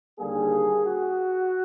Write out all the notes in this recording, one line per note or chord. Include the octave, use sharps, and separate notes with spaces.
D#2 D3 G3 A#3 G#4
F#4